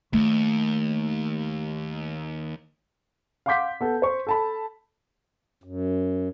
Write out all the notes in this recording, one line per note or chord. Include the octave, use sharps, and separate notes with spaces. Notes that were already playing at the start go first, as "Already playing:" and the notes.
D#2 A3
F5 F#5 C6 D6 G6 B6
B3 A4
C5 C#6
A4 A5 B5
F#2